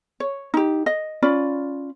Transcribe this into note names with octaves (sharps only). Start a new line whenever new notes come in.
C#5
D#4 G4
D#5
C#4 F4 D5 B5